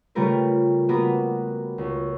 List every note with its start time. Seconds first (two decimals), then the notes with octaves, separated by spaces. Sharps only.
0.15 C#3 G3 A3 F4 A#4 B4
0.89 A#3 B3 F#4 A#4 B4
1.78 C#2